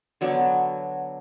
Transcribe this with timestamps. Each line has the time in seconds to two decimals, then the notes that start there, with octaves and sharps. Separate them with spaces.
0.21 D3 F#3 B3 D4